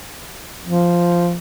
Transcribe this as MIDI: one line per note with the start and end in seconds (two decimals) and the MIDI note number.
0.65 1.37 53